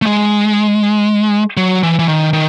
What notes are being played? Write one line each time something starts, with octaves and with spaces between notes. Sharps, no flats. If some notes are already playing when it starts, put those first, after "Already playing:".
A3
G#3
F#3
E3
E3
D#3
D#3